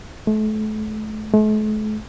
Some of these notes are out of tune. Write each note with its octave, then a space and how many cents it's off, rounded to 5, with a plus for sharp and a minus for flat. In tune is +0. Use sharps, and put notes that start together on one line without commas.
A3 -35
A3 -45